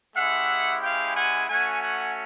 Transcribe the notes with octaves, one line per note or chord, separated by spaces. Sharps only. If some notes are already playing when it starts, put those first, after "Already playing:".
G#3 C#4 E4 G4 E5 F#5
F5 G5
F#5 G#5
A3 C#4 F#4 F#5 G#5
F#5 G#5